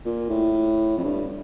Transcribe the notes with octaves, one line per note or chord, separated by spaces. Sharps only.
A#2
A2
F2
G2